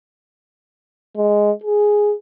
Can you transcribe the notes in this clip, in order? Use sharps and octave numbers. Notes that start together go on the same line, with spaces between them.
G#3
G#4